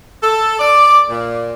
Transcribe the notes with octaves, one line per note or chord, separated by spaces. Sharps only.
A4
D5
A#2